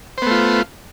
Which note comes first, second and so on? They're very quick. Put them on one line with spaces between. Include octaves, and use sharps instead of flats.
C5 B3 A3 F4